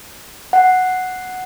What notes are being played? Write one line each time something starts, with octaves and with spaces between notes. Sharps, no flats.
F#5